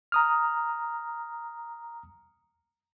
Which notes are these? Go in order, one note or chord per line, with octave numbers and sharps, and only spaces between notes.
A#5 D#6 F6